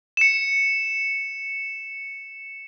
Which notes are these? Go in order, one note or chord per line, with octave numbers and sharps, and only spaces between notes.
C#7 E7